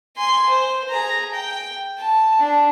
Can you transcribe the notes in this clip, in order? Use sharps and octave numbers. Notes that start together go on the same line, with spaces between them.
G#5 C6
C5
G#4 A#5
G5
A5
D4